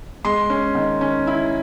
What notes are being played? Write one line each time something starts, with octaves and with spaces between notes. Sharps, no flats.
G#3 C6
C#4
D#3
C#4
E4